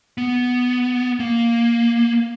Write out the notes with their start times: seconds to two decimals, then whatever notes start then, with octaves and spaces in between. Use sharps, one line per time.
0.18 B3
1.20 A#3